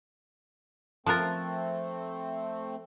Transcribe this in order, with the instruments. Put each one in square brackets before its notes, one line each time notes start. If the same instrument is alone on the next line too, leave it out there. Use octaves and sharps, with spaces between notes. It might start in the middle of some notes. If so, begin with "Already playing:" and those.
[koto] F3 F4 A#4 [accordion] A3 C4 [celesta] A5 F#6 A6